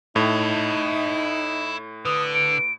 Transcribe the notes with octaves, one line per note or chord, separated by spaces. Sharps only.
A2 D#4 E4 A5
D3 B4 D#6
D7